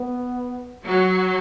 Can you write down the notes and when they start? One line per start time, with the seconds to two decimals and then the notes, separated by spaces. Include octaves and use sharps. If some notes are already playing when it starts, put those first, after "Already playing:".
Already playing: B3
0.85 F#3